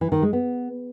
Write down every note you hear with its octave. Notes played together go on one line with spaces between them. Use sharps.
E3
D#3
G#3
B3